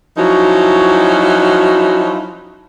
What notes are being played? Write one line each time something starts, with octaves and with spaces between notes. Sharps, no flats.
F3 F#3 C#4 D#4 E4 F#4